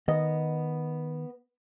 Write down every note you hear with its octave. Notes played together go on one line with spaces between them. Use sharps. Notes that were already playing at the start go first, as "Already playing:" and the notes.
D#3 B3 D#5